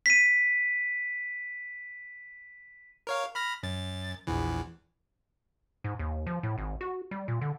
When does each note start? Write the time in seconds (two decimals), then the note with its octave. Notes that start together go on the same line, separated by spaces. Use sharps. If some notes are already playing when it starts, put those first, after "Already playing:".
0.06 B6 D#7
3.07 A#4 C#5 F5
3.35 B5 F6 A#6
3.63 F#2 A6
4.27 A#1 E2 E3
5.84 G#2
5.99 D#2
6.27 F3
6.43 A2
6.58 G#1
6.81 F#4
7.11 G3
7.28 A#2
7.41 D3